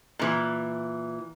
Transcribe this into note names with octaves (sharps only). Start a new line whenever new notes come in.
A#2 E3